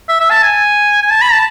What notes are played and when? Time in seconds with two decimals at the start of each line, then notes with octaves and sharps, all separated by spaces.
0.09 E5
0.20 E5
0.31 A5
0.43 G#5
1.02 G#5
1.10 A5
1.21 B5
1.33 A5